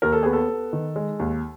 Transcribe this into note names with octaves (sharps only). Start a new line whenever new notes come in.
D#2 A#4
A4
B3 G#4
A4
B3
D#3
G#3
D#2